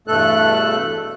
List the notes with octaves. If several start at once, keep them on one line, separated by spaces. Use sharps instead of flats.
E2 G2 B2 A3 A4 F#6